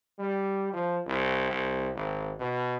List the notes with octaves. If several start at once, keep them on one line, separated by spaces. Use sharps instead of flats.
G3
F3
C2
C2
G#1
B2